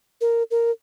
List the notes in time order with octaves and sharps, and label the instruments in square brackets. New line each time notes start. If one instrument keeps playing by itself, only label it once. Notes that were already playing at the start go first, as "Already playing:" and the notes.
[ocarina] A#4
A#4